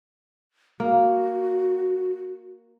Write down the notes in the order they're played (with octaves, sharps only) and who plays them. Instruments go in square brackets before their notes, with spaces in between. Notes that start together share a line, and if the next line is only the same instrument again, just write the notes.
[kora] A#3 [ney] F#4